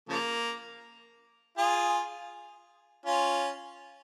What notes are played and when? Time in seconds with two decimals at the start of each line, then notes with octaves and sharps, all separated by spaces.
0.09 C#3 F3 A#3
1.58 F4 G#4
3.06 C#4 F4